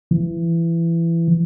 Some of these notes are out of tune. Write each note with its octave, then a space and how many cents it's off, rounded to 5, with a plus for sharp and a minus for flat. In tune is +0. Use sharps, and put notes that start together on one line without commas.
E3 +20